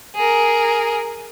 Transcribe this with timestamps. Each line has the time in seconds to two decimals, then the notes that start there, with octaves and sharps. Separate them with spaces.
0.15 G#4 A#4